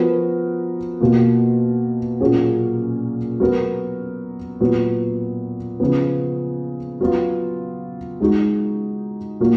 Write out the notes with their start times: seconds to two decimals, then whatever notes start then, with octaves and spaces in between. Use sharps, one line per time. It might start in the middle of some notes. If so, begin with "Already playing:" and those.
Already playing: F3 B3 F#4 A#4
1.00 B2 A#3 F4
2.20 A#2 F#3 A#3 C#4 G#4
3.40 F#3 B3 F#4 A#4
4.60 A#2 F#3 B3
5.80 C#3 F3 B3
7.01 F#3 B3 F4
8.20 G#3 D#4 F#4
9.40 A#2 F#3 A#3